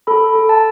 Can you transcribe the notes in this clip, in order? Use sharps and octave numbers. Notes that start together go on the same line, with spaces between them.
A4 B5
A4
A5